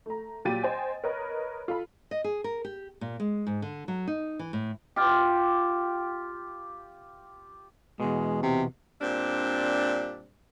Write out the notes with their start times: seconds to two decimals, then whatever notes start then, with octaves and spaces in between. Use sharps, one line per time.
0.06 A3 A#5
0.45 A#2 F#3 G4 A6 D#7
0.63 C5 D#5 G5 G#5
1.04 A#4 B4 C#5 D#5
1.68 F4 A4 B5
2.11 D#5
2.24 G#4
2.44 A#4
2.65 G4
3.01 A#2
3.20 G#3
3.47 G#2
3.62 D3
3.88 F#3
4.07 D#4
4.39 E3
4.53 A2
4.96 F4 G4
8.00 E2 B2 G#3
8.43 C3
9.01 A#2 G3 C4 D4